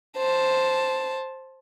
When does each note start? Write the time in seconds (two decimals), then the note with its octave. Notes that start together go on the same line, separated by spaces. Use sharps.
0.17 C5 A5